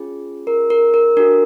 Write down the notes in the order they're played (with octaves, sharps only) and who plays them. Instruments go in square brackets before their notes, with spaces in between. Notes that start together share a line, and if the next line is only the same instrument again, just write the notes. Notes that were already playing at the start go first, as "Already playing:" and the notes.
Already playing: [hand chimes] C#4 F4 G#4
A#4
A#4
A#4
D4 F#4 A4 A#4